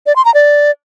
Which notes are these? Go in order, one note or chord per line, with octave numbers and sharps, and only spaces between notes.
D5
C6
A#5
D5